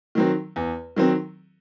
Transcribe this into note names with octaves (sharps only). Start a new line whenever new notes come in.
D#3 F#3 C4
E2
D#3 F#3 C4